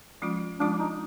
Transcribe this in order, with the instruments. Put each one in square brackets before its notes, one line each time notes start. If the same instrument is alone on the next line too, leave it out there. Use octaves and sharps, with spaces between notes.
[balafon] F3 G#3 C#4 F4
[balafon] F3 G#3 C#4 F4 [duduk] D4
[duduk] D#4